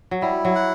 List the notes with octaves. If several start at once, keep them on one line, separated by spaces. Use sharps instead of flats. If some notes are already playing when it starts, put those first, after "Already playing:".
F#3
G3 E4
F#3
F#5